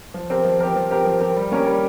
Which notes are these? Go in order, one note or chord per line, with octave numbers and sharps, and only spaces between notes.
F3
C4 G4 A#4
F3
C4 G4 A#4
F3
C4 G4 A#4
F3
C4 G4 A#4
G3
A#3 C#4 G4 A#4
G3